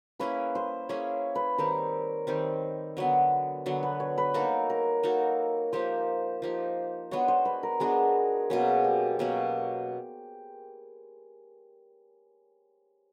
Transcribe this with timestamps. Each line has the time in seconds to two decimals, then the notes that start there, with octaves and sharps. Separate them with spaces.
0.20 A#3 C#4 E4 G#4 B4
0.55 C5
0.89 A#3 C#4 E4 G#4 C#5
1.35 B4
1.58 D#3 G3 C4 A#4
2.27 D#3 G3 C4
2.97 D3 F#3 B3
3.66 D3 F#3 B3
3.83 B4
4.00 C#5
4.18 B4
4.34 A#3 D#4 F#4 A4 A#4
4.70 A#4
5.03 A#3 D#4 F#4 A4
5.73 F3 A#3 D#4 G4 C5
6.42 F3 A#3 D#4 G4
7.11 G#3 B3 D4 F#4 C#5
7.28 C5
7.45 B4
7.63 A#4
7.80 G#3 B3 D4 F#4 G#4
8.50 B2 F#3 A#3 C#4 G#4
8.84 G4
9.19 B2 F#3 A#3 C#4